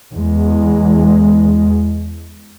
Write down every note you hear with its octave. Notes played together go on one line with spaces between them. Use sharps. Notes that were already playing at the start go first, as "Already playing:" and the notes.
E2 G#3